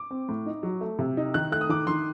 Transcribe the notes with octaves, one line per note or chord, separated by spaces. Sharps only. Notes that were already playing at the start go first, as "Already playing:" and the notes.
Already playing: D6
C4
A2
D#4
F#3
A3
C3
D#4
D#3 F#6
A3 F#6
D#6
D#3 D6
D#3 C6